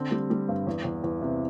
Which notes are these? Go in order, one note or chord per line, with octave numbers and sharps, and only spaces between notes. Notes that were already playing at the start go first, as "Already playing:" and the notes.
Already playing: D3 C4
G3
G3
G2
E2
E2
E2
C3